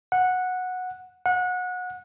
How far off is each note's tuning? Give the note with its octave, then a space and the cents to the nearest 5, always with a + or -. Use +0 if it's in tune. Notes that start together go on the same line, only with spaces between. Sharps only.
F#5 -10
F#5 -25